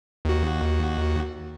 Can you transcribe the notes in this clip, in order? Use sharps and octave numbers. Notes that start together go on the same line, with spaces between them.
D#2 F#4